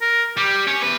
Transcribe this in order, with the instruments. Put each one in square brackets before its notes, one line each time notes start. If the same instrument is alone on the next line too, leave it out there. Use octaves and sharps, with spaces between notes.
[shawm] A#4
[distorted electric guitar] G3 [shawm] G4
[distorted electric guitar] C#4 C#5
E2 B4